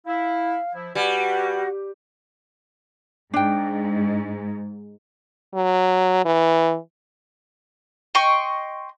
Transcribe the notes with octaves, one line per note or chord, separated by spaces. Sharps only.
E4 F5
F3 E4
G3 F#4 B4 F#5 G#5 C#6
G#2 D4 G5
F#3
E3
D#5 G5 C6 C#6